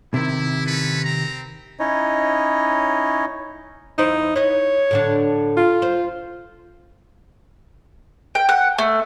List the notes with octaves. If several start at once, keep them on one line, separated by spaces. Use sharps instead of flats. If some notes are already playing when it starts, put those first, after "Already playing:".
C3 D#3 E4
C#4 A4 B4
C4 A#5
C#4 D#4 E4 C#5 D#5
E2 D#4 E4 C5
B4 C#5 D#5
A2 D3 D4
F4
C5
G5
F#5
A3